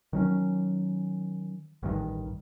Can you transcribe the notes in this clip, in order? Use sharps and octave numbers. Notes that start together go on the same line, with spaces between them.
D#3 F#3 C#4
A1 G2 D#3